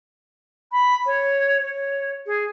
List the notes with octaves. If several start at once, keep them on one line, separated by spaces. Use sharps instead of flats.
B5
C#5
C#5
G#4